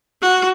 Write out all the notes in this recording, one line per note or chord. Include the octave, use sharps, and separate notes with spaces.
F#4